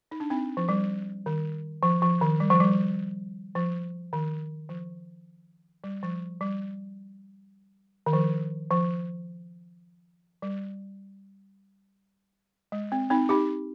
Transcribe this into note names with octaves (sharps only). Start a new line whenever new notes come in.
D#4
D4
C4 D#4
F3
G3
D#3
F3
F3
D#3
G3
F3
G3
F3
D#3
F3
G3
F3
G3
D#3
F3
F3
G3
G#3
C4
C4 D#4
D#4 G4